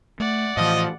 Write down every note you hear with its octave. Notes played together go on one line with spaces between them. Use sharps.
A3 D5 F#5
A2 E3 F3 D#5